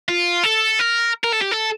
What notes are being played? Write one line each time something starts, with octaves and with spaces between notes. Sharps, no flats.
F4
A4
A#4
A#4
A4
G4
A4